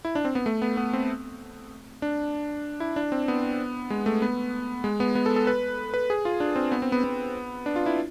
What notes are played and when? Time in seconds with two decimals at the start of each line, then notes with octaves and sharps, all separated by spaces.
0.05 E4
0.15 D4
0.25 C4
0.35 B3
0.46 A3
0.62 B3
0.77 B3
0.93 C4
2.02 D4
2.80 E4
2.96 D4
3.12 C4
3.28 B3
3.90 G#3
4.06 A3
4.22 B3
4.84 G#3
5.00 B3
5.15 B3
5.26 A4
5.36 A4
5.47 B4
5.94 B4
6.10 G#4
6.25 F4
6.40 D4
6.56 C4
6.72 B3
6.82 C4
6.92 B3
7.04 B3
7.66 D4
7.76 F4
7.86 E4